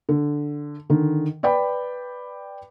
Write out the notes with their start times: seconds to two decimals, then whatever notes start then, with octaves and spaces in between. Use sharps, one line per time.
0.09 D3
0.90 D3 D#3
1.43 B4 D5 G5 B5